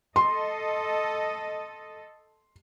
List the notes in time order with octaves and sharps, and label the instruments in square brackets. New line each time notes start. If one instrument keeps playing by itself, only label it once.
[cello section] A4 D#5 [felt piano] C6